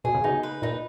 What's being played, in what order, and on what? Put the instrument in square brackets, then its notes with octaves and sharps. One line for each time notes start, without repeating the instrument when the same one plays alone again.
[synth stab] B2 [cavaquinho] G#4
[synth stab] C#3
[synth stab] B2 [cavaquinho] D#4
[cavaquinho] B4
[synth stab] A#2 [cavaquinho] D#4